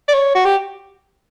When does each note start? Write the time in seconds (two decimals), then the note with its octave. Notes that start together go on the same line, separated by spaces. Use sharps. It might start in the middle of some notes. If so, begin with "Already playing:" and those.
0.09 D5
0.14 C#5
0.35 F#4
0.45 G4